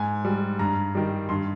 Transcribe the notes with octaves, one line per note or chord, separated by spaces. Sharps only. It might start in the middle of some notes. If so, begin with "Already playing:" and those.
Already playing: G#2 G#5
G3
G2 A#5
D#3 G3
G2 C6